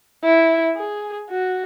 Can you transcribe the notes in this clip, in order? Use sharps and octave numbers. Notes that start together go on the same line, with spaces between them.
E4
G#4
F#4